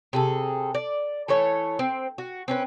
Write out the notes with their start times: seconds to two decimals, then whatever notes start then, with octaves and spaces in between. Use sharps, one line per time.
0.13 C3 G#4 A4
0.74 D5
1.28 E3 A3 A4 C#5
1.79 C4
2.18 F#4
2.48 C4 C#4 B4